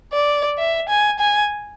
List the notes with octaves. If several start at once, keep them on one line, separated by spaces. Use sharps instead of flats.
D5
E5
G#5
G#5